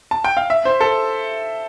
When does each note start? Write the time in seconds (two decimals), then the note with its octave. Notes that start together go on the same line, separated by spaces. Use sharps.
0.11 A5
0.24 G5
0.37 F5
0.50 E5
0.65 C5
0.81 A4